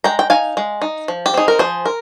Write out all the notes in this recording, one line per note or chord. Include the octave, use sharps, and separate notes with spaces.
G#3 G5 A#5
G5
D#4 F5 G#5
G#3
D#4
F3
G4
C4 D#4 G#4
A#4
F3 G#4 C5
A#4